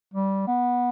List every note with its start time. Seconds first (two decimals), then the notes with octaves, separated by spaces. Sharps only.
0.14 G3
0.47 B3